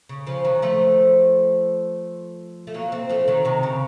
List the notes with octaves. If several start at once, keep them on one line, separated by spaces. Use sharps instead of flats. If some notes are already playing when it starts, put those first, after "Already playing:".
C#3
C#3 F3
D#3 F#3
F3 A3
A3
F#3 A#3
A3 C4
F3 A3
D#3 F#3
C3 D#3
C#3